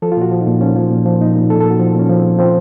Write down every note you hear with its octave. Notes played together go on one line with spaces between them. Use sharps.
F3 A4
F4
A#2 F#4
F3
D#4
A#2
F3 C#4
F3
A#2
F3
A#2 D#4
A#2
A#2 A4
A#2 A4
F#4
F3 F4
A#2 C#4
F3
A#2 C4
F3 C4